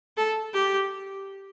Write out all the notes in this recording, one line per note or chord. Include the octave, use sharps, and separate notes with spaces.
A4
G4